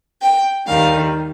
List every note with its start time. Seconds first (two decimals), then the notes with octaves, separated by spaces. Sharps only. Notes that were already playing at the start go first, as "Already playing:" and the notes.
0.22 G5
0.67 D#2 D#3 G3 F5